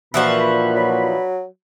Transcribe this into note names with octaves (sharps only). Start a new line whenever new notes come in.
A#2 E3 F3 D4 F#4 B4 B5
F#3